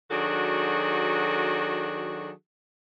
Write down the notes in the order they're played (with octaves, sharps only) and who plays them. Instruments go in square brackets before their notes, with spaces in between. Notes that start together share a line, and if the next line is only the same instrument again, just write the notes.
[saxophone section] D#3 F#3 D4 F#4 G#4 A4